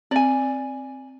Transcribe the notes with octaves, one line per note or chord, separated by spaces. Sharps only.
C4 D5 G#5